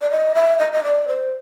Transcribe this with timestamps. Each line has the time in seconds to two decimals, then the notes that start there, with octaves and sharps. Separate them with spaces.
0.01 D5
0.11 D#5
0.35 E5
0.59 D#5
0.72 D#5
0.84 D5
1.08 C5